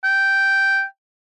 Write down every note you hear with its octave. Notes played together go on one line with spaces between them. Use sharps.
G5